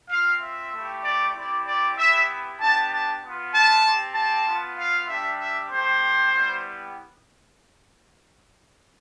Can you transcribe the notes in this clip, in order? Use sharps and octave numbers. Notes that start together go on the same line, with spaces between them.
C4 F4 F5
E5
A3 E4 G4
D5
C4 E4 G4 D5
D5
B3 E4 G4 E5
B3 D4 G4 A5
A5
B3 F4
A5
C4 G4
A5
B3 F4
F5
G3 D4 G4 E5
E5
A3 C4 G4 C5
G3 B3 E4 G4